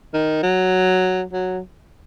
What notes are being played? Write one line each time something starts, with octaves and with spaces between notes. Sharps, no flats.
D#3
F#3
F#3